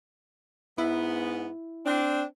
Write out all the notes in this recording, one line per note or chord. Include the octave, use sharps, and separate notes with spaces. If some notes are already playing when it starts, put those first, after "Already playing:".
G#2 B3 E4
C4 D4